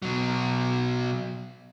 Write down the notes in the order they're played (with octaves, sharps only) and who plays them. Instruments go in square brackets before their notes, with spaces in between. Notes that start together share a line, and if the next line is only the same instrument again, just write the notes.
[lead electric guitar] B2 F#3